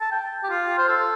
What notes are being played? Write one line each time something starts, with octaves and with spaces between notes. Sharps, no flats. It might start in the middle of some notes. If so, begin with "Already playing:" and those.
A5
G5
G4
F4
C5
A4